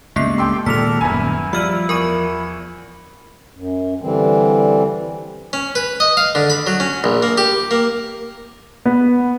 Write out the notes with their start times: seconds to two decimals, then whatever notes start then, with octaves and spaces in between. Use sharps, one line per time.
0.16 C#2 G2 A#3 B3 C7
0.38 G4 A4 G5 C6
0.66 A#2 D#3 G#3 D4 A4 A#4 B6 F7
1.01 D#1 F#2 B3 E4 G#5
1.53 F3 G3 E6 F6 D#7
1.89 E2 A#4 C#6 D#7
3.55 F#2
4.01 D3 E3 G3 C4
5.53 C#4
5.75 B4
6.00 D#5
6.17 F5
6.35 D3
6.50 B5
6.67 F#3
6.80 C#4
7.04 A#1
7.22 A#3
7.38 G4
7.71 A#3
8.85 B3